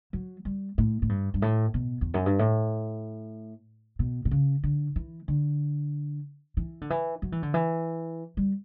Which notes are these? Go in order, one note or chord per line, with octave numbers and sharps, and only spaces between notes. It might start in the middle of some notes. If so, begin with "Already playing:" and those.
F#3
G3
A2
A2
G2
G2
A2
B2
E2
F#2
G2
A2
B2
B2
C#3
D3
E3
D3
E3
D3
E3
F#3
E3
D3
E3
G3